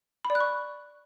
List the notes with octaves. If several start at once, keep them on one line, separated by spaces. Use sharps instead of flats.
B5
D5
F#6
C#6